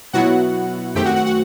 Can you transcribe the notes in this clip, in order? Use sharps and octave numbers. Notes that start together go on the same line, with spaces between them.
B2 F#3 B3 E4 F#4 F#5
F#2 D#3 A3 C4 G4 G5
F#4 F#5
F#4 F#5
F#4 F#5